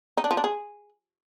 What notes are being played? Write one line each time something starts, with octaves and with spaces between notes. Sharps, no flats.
D#4
D4
F3
D4
G#4